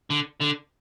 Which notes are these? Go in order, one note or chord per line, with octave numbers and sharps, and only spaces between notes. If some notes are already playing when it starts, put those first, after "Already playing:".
D3
D3